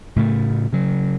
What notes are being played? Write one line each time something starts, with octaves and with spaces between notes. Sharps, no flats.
A2 C#3 A3
C#3 F#3